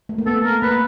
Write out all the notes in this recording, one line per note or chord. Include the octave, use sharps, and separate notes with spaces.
A3
A#3
B3 A4
A#4
A#3 B4